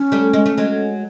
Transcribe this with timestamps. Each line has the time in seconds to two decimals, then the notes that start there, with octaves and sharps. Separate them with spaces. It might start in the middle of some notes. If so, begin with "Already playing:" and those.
Already playing: C#4
0.12 G3 A3
0.33 G#3
0.46 A3
0.57 F#3 G#3